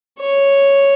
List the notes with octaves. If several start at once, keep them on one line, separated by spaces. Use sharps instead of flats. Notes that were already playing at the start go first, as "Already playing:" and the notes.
C#5